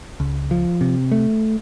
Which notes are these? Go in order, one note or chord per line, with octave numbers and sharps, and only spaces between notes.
C#2
F3
C3
A3